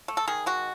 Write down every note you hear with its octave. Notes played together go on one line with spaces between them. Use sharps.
A3
A4
D#3 G#4
G#3 F#4